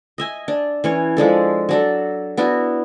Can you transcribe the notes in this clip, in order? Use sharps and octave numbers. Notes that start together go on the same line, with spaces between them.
D#5 E5 G#5
D4
E3 C#4 C#5
F3 G#3 D4 A4
F#3 D4 A4
B3 D4 E4 F#4